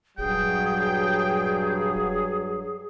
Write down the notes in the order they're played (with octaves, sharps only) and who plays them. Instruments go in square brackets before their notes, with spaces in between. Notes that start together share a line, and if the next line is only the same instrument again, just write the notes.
[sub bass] D#1 [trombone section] G2 F#3 [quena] G#4 [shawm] G5